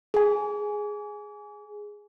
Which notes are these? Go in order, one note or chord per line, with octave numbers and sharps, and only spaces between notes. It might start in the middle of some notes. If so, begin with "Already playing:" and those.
G#4 G#5